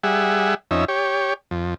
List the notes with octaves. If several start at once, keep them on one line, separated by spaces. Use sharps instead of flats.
G3 G#4 E5 F#5
F2 C#4 D#4 E5
G4 C#5
F2